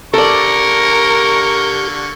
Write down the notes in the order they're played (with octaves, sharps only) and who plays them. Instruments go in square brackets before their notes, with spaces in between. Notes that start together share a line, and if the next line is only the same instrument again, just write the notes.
[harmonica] D3 A#3 C#6 [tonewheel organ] G4 [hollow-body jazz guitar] A4 D5 [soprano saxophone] A#4